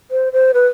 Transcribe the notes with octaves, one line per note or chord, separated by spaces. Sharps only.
C5
C5
B4